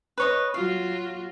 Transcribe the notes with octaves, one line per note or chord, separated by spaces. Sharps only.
B4 C#5 D#5
F#3 F4 F#4 F5